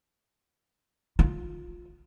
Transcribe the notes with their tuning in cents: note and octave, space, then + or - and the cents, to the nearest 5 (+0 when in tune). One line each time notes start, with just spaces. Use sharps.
F4 +15